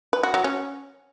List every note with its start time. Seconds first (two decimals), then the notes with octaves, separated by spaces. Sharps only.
0.13 B4
0.23 F#4
0.34 F#3
0.44 C#4